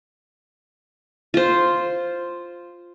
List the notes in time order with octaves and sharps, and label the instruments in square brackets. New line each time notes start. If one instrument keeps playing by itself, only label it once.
[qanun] F4 C5